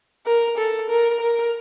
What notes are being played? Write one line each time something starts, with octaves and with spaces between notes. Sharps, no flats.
A#4
A4
A#4
A#4